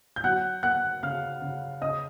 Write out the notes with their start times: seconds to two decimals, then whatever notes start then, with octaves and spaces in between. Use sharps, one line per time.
0.16 G6
0.24 F#3 F#5 F#6
0.63 A#3 F#5 F#6
1.03 C#3 F5 F6
1.41 C#3
1.81 C#3 D#5 D#6